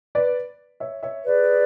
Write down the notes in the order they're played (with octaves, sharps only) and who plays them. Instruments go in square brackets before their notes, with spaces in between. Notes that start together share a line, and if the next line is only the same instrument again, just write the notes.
[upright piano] B4 D5
C#5 E5
C#5 E5
[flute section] G#4 B4 D5